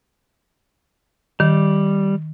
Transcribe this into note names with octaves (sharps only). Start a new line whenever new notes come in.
D#3 G3